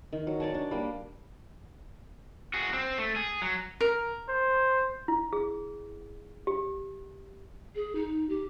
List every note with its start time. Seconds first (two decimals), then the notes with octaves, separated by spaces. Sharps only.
0.13 D#3
0.27 F#3
0.40 C#5 D5 G#5 A5
0.54 D4
0.71 G3 A#3
2.54 F#4 G#4
2.73 C4
2.98 A3
3.16 G#4
3.42 F#3
3.81 A#4
4.28 C5
5.08 E4
5.33 G#4
6.47 G4
7.75 G#4
7.95 D#4
8.29 G4